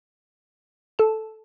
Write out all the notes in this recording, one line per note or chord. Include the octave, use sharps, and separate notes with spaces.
A4 A5